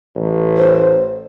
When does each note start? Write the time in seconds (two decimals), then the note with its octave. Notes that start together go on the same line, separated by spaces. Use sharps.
0.15 A1
0.57 C5